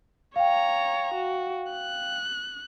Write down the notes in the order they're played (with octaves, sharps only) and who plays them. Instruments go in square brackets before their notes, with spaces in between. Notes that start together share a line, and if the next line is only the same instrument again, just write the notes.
[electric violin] C#5 A#5 [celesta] F5 G5
[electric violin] F#4
F#6